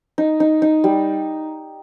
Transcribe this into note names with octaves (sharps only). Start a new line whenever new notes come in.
D#4
D#4
D#4
G3